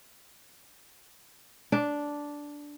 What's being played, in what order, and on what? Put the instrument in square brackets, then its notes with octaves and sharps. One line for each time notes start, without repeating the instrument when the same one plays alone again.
[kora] D4